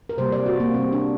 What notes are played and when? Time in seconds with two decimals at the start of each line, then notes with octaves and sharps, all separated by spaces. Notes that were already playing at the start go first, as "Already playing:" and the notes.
0.09 A#4
0.18 C3 G3 A#3 C5
0.32 D5
0.46 F#4
0.60 A#3
0.74 C3 G3 A#3 C4
0.92 D4